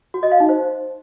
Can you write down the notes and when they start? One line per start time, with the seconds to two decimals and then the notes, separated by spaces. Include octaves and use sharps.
0.14 F#4
0.23 D#5
0.32 F5
0.40 D#4
0.49 C5